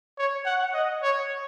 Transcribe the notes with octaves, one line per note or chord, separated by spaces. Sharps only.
C#5
F#5
D#5
C#5